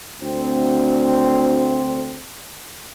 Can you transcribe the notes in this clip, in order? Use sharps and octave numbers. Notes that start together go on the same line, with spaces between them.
D2 C4